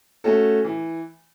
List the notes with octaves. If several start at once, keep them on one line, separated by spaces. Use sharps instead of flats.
A3 C#4 F#4 A4
E3